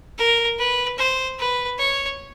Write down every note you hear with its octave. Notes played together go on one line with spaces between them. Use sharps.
A#4
B4
C5
B4
C#5